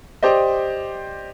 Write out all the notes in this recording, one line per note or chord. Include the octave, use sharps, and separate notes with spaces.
G4 C5 D5 D#5